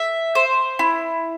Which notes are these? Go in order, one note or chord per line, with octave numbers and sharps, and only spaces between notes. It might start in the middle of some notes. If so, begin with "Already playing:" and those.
Already playing: E5
C5
E4